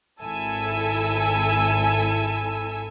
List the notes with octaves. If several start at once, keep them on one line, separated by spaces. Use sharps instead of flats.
G#1 E4 A4 G#5 E6